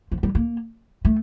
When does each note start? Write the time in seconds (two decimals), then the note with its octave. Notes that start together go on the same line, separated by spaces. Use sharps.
0.12 F3
0.23 G3
0.35 A#3
1.05 A3